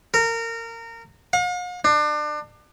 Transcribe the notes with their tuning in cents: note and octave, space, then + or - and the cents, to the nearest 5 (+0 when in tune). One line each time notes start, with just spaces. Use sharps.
A#4 -25
F5 +45
D4 +30